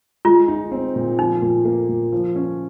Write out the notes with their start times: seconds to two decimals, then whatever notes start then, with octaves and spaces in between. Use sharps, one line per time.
0.25 G#3 F4
0.48 D#4
0.71 C4
0.96 A#2
1.18 F3 D#4
1.42 A#2
1.65 A#3
1.89 A#2
2.12 F3
2.36 C#4